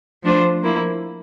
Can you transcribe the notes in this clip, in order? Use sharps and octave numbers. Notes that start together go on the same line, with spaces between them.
F3 A3 D4 F4 C5
F3 A#3 E4